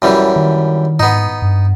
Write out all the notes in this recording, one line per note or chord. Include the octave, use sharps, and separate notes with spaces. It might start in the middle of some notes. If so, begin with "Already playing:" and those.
F#2 E3 G3
D#3
G#2 B3 D#4
G2